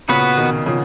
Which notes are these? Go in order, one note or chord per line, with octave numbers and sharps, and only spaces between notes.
A#2 C#3 B3 F#4 B4
B2 D#3
C#3 F3